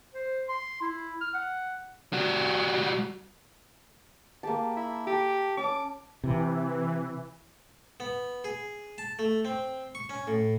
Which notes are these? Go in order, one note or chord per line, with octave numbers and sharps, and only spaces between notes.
C5
C6
E4
F6
F#5
G3 F#4
A#3 G4 G#4 A5
E4
G4 A4
C#4 A5 D6
C3 E3
B3
G#4
A5
A3
C4
C#6
C#4
A2